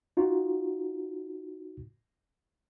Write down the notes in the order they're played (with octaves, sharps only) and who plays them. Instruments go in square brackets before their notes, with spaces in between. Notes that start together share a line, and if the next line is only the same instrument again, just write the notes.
[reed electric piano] D#4 F4 F#4